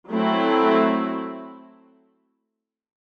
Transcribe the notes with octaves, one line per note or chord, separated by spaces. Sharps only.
F#3 A3 C4 E4